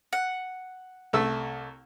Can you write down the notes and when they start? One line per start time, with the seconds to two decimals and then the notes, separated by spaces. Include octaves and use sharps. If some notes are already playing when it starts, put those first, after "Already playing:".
0.13 F#5
1.13 C2 A3 E6